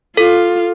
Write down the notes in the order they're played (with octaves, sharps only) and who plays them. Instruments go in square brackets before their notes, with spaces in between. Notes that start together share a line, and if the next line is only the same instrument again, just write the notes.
[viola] F4 [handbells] A4